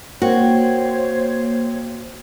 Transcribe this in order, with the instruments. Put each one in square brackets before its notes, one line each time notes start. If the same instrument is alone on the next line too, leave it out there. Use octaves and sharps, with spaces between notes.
[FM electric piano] A#3 [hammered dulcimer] C4 G5 [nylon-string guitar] F#4 [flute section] C5 C#5